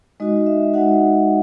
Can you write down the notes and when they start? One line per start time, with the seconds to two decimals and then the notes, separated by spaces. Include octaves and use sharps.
0.20 G#3 D#4 F#4 D#5
0.47 E5
0.74 G#3 D#4 F#4 F#5